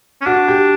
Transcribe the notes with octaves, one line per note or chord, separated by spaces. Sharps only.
C#4
D4 F#4
G4